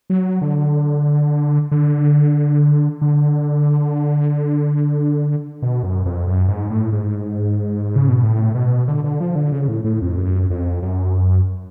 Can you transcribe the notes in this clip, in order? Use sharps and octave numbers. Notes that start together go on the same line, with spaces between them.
F#3
D3
D3
D3
B2
F#2
F2
F#2
G#2
A2
G#2
C#3
B2
A2
B2
D3
D3
F3
D3
C#3
A2
A2
F2
F#2
F2
F#2